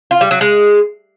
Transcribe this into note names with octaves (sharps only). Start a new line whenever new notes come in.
F4
G3
F#3
G#3